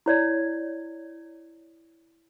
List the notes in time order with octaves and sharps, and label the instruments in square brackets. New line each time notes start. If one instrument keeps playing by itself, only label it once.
[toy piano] E4 C#5 D5